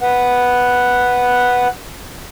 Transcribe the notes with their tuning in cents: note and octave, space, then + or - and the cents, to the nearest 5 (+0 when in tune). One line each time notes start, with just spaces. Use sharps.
B4 +0 F#5 +0